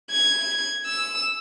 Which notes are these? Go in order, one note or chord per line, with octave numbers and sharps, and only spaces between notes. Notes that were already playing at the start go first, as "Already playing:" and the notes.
G#6
E6